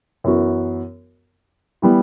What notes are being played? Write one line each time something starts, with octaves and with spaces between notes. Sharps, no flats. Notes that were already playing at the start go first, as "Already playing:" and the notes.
F#2 E3 B3 F#4
E3 G3 B3